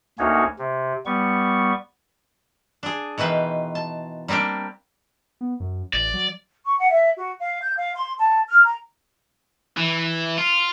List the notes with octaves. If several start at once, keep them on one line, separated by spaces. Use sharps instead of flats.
D2 A#3 C#4 D#4 F#4 C#5
C3
G3 B3 C#6
D4 G#4
B2 D#3 E3 B4 C5
A5
G3 A#3 C4 D4 G4
B3
F#2
A1 D5
F#3
C#6
F#5
E5
F#4
F5
G6
F5
C6
A5
F6
A#5
E3
F4